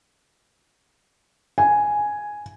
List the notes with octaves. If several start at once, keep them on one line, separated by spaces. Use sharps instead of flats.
G#5